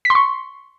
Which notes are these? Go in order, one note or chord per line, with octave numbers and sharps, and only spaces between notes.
B6
C6
C#6